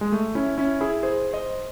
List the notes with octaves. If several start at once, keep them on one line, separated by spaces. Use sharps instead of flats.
G#3
A3
C#4 E4
C#4 E4
E4 G#4
G#4 C5
C5 D#5